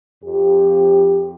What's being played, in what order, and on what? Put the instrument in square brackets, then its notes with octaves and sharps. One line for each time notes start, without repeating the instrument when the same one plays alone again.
[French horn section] F2 G4